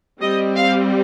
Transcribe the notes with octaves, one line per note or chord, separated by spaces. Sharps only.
G3 C4 D#5
F5